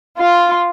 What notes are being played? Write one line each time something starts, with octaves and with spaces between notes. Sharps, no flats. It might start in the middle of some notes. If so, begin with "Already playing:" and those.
F4